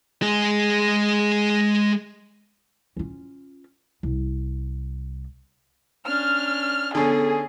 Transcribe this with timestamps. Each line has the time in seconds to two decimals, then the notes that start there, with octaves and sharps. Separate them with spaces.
0.22 G#3 G#4
2.97 C#4 F4
4.03 C2
6.07 C#4 D4 F6
6.95 D3 B3 C#4 G#4 A4